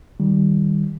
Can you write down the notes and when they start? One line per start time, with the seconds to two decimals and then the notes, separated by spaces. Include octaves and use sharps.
0.20 D#3 G3